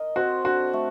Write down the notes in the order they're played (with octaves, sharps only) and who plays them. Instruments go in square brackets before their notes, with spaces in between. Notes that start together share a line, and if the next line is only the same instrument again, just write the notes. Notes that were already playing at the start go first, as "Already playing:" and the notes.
Already playing: [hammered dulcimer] A#4 D#5
[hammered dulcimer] C4 [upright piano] F#4
[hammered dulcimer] D3 [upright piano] F#4
[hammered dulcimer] A3